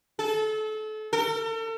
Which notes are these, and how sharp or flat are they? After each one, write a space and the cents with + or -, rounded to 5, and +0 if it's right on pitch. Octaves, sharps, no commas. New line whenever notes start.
A4 -30
A4 +45